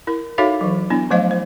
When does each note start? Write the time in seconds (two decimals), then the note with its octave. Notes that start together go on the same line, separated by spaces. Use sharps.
0.07 E4 A#4
0.38 D#4 F#4 A4 C#5 E5 F5
0.61 E3 F#3
0.90 B3 D4 E4
1.10 F3 F#3 A3 C5 D#5 F5
1.31 C5